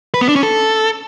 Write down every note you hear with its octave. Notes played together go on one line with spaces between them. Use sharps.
B4
B3
D4
C#4
A4